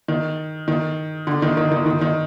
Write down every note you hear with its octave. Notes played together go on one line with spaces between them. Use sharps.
D#3
D#3
D3
D#3
D#3
D#3
D#3
D#3